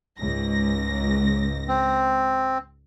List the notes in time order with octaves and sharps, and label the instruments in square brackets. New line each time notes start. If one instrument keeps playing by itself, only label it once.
[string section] C#2 G#2 A#6
[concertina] C4